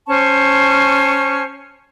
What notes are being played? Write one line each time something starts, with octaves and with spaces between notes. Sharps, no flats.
C#4 C5 A5 C#6